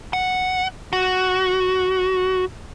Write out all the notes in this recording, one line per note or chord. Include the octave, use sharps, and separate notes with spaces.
F#5
F#4